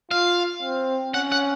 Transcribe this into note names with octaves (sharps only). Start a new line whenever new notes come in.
F4 F5
C4
C#4 F#5
F#5